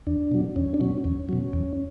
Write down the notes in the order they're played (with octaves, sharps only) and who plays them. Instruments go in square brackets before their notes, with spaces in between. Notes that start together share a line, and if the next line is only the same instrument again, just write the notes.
[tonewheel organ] E2 D4
B2 F#3
E2 C#4
D4
B2 F#3 C#4
E2 C#4
B2 F#3
E2